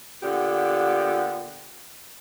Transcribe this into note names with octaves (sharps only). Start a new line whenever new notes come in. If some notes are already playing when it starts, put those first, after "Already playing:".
A#2 D3 B3 G4